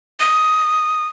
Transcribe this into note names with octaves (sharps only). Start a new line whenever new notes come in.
D#6